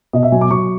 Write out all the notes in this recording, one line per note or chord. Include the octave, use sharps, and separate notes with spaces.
B2 D#5
E5
F#3 G#5
D6
F#3 C#6